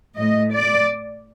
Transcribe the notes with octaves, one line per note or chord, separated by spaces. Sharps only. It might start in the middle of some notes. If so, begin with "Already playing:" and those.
A2 A3 D#5
D5